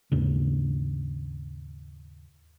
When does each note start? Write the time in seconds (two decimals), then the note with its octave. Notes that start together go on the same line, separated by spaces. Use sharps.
0.12 D#2 G#2 C#3